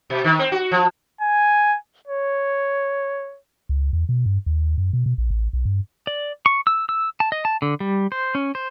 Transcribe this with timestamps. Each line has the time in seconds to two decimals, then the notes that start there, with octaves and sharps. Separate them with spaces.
0.10 B2
0.24 D#3
0.39 C4
0.52 F#4
0.71 F3
1.21 G#5
2.07 C#5
3.69 C#2
3.93 E2
4.09 B2
4.26 G2
4.46 D#2
4.78 F#2
4.93 B2
5.06 B2
5.18 A#1
5.31 A1
5.53 B1
5.65 G2
6.07 D5
6.46 C#6
6.67 E6
6.89 E6
7.20 A5
7.32 D#5
7.45 A5
7.62 D3
7.80 G3
8.12 C5
8.35 C#4
8.55 C5